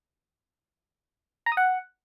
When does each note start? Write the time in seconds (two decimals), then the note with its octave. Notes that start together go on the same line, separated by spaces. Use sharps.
1.46 A#5
1.52 D#6
1.57 F#5